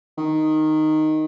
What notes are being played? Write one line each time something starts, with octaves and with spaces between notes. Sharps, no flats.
D#3